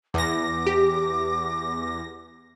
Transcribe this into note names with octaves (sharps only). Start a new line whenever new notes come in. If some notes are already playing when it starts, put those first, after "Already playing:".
E2 D6 A#6
G4